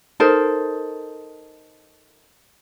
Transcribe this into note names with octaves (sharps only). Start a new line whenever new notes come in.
D#4 A4 A#4 C5